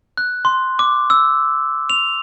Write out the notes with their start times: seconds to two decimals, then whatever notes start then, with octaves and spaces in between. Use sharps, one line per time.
0.17 F#6
0.45 C6
0.79 D6
1.10 E6
1.90 F7